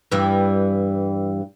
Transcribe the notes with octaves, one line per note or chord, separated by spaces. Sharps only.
G2 E3